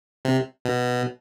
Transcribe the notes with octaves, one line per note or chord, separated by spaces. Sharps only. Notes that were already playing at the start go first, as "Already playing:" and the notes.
C3
B2